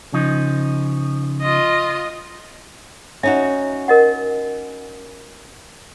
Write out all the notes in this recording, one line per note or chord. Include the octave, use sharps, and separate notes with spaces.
C#3 F3 D#4
F4 D#5
C#4 D#4 F#4 E5
A#4 D#5 F#5